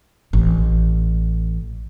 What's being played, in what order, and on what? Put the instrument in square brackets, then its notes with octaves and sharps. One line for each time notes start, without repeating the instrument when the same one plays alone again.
[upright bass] A1